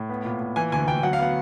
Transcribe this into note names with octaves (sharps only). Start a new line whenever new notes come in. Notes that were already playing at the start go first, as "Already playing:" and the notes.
Already playing: A2
B3
A#2
A#2
E3 G#5
D2 G#5
D2 G5
F#3 F#5
F5
B3 F#5